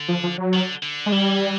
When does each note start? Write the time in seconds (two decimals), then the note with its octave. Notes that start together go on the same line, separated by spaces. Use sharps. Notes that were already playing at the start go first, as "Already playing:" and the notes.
Already playing: D3
0.08 F3
0.23 F3
0.38 F#3
0.53 D#3
0.63 D3
0.83 D3
1.06 G#3
1.12 E3 G3